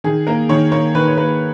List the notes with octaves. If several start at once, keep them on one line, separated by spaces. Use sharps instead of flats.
D#3 G#4
A#3 A#4
D#3 C#5
A#3 C#5
D#3 B4
C#5
A#3 B4